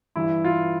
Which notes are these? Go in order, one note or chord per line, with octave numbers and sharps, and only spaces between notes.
G2 E3 E4
F4